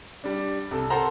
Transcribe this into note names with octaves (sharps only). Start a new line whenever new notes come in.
G3 D4
C2 A4
A4 A#4 C5 F#5 A5 A#5